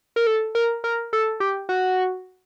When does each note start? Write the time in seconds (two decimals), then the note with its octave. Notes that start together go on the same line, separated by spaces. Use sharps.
0.16 A#4
0.27 A4
0.55 A#4
0.84 A#4
1.13 A4
1.40 G4
1.69 F#4